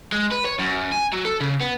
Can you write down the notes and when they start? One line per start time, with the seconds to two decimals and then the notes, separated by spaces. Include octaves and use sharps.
0.12 G#3
0.31 B4
0.45 C#5
0.59 F#2
0.92 G#5
1.13 F#3
1.25 A4
1.41 C#3
1.61 B3